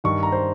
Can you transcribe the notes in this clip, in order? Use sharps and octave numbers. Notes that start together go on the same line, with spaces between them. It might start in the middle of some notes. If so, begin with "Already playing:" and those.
G2 D#3 C#6
A#5
C5